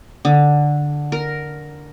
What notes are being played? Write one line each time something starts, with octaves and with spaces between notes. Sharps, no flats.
D3
A#4